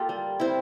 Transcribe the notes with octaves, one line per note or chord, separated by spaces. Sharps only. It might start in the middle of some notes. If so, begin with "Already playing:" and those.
Already playing: A#3 F4 G4 A4
G3
C4 E4